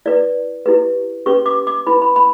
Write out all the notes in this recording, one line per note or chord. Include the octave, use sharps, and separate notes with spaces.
E4 B4 D5
E4 G4 B4
C#4 G4 B4 C#6
D6
D6
E4 B4 B5
B5
B5